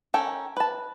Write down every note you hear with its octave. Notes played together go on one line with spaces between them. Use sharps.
C#4 A4 A#4 G5
B4 A5